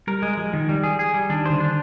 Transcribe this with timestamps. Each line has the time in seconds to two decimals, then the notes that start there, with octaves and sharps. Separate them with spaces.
0.07 G3 A#4
0.22 G#3
0.37 F3 G#3
0.53 D#3
0.69 G3
0.84 G#4
0.99 G#4
1.14 G3
1.30 D#3 D4
1.46 D3 C5
1.60 D4